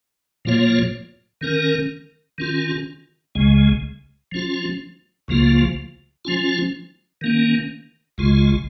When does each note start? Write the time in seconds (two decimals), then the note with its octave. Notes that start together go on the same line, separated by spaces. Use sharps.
0.45 A#2 F3 A#3 F4 C#5
1.41 D#3 C#4 A#4
2.38 D#3 C#4 F4
3.35 C#2 C#3 G#3
4.32 F3 C#4 F4
5.28 C#2 C#3 F3 A#3 F4
6.25 F3 C#4 F4
7.21 D#3 A#3 C#4
8.18 C#2 C#3 G#3 F4